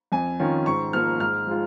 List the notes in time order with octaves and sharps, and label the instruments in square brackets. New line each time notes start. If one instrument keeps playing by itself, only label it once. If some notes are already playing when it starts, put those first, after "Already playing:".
[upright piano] F2 G#5
D#3 C#4 F4
G#2 C#6
F3 A#3 F6
G#2 F6
F3 G#3 F4